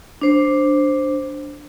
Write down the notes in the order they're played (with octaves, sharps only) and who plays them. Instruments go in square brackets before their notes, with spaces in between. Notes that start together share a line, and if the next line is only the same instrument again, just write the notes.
[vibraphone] D4 C5